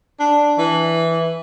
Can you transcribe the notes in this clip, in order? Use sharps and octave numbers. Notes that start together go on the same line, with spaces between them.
D4
E3